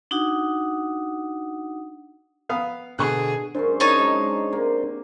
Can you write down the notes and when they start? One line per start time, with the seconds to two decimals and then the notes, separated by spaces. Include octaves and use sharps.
0.11 D4 D#4 F#4 F#5 D#6
2.49 B3 F5 D#6
2.99 B2 D3 G#4 C#6 F#6
3.55 F#2 C#3 C#4 D4 C5
3.80 D#4 C#5 A5
3.99 G#3
4.53 C3 A#3